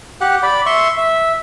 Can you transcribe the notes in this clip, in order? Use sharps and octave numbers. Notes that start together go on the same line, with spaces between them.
G4 F#5
D5 B5
E5 C6 C#6
E5